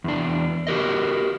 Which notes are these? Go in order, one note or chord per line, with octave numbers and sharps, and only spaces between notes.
E2 D4
F#4 G4 A#4 D#5